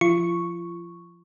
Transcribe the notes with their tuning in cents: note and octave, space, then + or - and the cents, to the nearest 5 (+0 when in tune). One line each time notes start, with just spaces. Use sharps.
F3 -5 F4 -35 C#6 +0